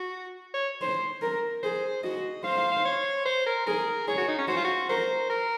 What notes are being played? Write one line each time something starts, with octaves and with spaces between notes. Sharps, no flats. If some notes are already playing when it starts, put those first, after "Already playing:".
Already playing: F#4
C#5
C5
A#4
G#4 C5
F#4 D#5
C5 F5
F5
F5
C#5
C5
A#4
G#4 A#4
G#4 C#5
F#4
D#4
C#4
F#4 C5
F4
F#4
A#4 C5
A#4